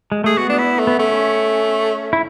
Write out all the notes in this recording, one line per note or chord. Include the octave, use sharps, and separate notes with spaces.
G#3
A3 G#4
B3 F#4
D4
E4
A3
B3
A3 C#4
E4